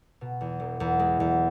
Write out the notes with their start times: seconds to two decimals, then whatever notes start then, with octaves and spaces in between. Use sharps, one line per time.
0.21 B2
0.41 E2
0.60 E1
0.80 E2
0.99 G#3
1.20 E2